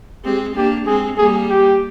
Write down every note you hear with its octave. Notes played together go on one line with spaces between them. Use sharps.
G#3 C4 G4
A#3 D4 G4
G#3 C4 G#4
G3 A#3 G#4
G4